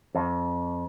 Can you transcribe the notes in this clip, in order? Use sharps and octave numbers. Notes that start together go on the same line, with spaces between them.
F2